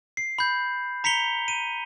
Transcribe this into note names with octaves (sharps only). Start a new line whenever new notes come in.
C7
B5 G6
A#5 B6 C#7 F7 G7
D#7